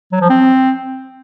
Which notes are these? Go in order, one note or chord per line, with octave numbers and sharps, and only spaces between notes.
F#3
F3
C4